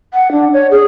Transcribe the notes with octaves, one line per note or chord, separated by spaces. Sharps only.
F#5
D4
C#5
G#4